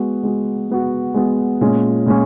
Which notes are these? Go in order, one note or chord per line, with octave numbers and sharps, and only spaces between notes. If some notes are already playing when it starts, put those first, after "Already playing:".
Already playing: G#3 B3 F#4
G#3 B3 F#4
G#3 B3 F#4
G#3 B3 F#4
A#2 G#3 C#4
A#2 G#3 C#4